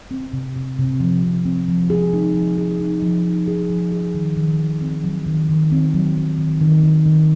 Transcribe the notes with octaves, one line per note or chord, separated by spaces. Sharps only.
C4
C3
C3
C3
F3
C3
C4
F3
G#4
D#4
F3
G#4
D#4
F3
D#4
G#4
F3
G#4
D#3
D#3
D#3
C4
F#3
D#3
D#3
C4
F#3
C4
D#3
D#3
D#3
D#3